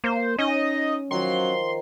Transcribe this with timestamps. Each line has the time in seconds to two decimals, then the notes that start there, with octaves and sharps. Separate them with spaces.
0.04 A#3 C5
0.38 C#4 D#4 D#5
1.11 D#3 F3 F#3 C6